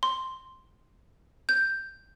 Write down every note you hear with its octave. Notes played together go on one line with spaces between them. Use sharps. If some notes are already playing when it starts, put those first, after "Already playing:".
C6
G6